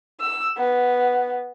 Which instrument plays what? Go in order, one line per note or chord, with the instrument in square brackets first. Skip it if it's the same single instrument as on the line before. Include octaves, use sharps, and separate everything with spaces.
[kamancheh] E6
B3